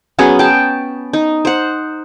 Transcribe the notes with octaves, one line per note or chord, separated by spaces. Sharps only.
F#3 B3 C#4 G#4
G5 A5
D#4
C5 F#5